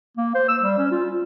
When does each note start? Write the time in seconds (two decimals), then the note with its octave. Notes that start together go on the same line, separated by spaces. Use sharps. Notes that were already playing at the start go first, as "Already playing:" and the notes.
0.17 A#3
0.35 C5
0.48 E6
0.62 G3
0.78 C#4
0.91 F4
1.06 F4